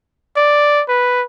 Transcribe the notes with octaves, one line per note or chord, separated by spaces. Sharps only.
D5
B4